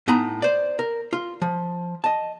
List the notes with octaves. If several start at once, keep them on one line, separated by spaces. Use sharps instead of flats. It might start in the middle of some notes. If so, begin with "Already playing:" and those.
A2 B3 D#4 G#5 A#5 B5
C5 D5
A#4
F4
F3
D#5 A5